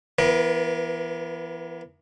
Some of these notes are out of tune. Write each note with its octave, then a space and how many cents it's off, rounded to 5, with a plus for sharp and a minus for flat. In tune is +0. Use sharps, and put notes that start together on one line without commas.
E3 +30 B3 +0 A#4 +35